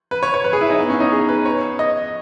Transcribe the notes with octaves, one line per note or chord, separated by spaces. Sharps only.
B4
C#5
C#5
B4
G#4
E4
D#4
B3
C#4
D#4
G#4
B4
C#5
D#5